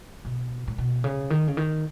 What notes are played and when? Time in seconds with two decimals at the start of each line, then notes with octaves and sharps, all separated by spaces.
0.25 B2
0.68 A2
0.78 B2
1.04 C#3
1.30 D#3
1.47 C#3
1.57 D#3